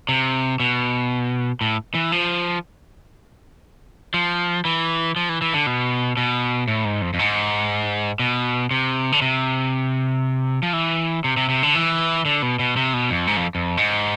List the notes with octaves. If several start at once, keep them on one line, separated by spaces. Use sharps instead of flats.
C3
B2
A2
E3
F3
F3
E3
F3
E3
E3
D3
B2
B2
A2
G#2
F2
F2
G#2
B2
C3
D3
C3
F3
E3
C3
C3
C3
D3
E3
D3
B2
B2
C3
B2
F2
G#2
F2
F2
G#2